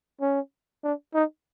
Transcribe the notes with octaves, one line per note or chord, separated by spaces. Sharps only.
C#4
D4
D#4